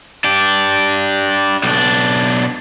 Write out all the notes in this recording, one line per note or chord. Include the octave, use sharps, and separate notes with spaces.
D4 G4
B1 D4